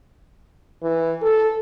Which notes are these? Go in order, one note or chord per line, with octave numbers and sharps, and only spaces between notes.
E3
A4